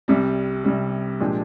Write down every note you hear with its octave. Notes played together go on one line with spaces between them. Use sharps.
C2 C3 G3
C2 C3 G3
A#2 F3 G#3 D4 G4